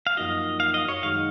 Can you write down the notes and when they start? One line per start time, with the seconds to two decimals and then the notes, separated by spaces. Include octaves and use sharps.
0.07 F5
0.17 F#2 F3 A#3 D#4 F#4 D#5
0.60 F5
0.74 D#5
0.89 C#5
1.02 F#2 D#3 G#3 D#4 F#4 F5